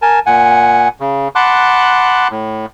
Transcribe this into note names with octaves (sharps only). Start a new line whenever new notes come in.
A#4 G#5 A5
A#2 F#5 G#5
C#3
F#5 A5 B5 C6 D6 F#6
A2